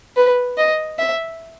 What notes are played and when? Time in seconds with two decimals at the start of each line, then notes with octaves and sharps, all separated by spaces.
0.17 B4
0.58 D#5
0.99 E5